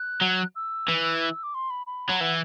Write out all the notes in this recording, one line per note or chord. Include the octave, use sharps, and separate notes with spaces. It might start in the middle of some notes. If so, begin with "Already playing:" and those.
Already playing: F#6
F#3
E6
E3
D6
C6
B5
B5
F#3
E3 F#5